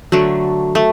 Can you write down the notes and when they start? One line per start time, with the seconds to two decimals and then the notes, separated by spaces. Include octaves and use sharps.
0.12 D3 F#3 A3
0.75 A3